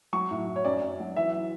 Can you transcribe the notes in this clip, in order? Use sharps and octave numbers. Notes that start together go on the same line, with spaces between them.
F#3 C#6
A2
A2
C#5
F#2 D5
F#2
F#3
E3 E5